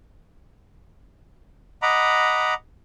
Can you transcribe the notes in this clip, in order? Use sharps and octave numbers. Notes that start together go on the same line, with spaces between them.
D#5 F#5 A#5 B5 D6